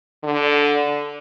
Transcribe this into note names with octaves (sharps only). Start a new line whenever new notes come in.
D3